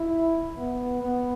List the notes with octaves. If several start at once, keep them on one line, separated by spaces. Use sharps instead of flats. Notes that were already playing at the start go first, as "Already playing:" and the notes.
Already playing: E4
B3
B3